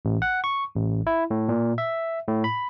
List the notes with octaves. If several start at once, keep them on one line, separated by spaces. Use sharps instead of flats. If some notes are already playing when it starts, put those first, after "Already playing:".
A1
F#5
C#6
A1
E4
A2
A#2
E5
A2
B5